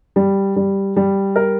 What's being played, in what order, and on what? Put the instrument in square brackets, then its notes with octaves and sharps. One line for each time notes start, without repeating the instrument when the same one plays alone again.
[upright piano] G3
G3
G3
A#4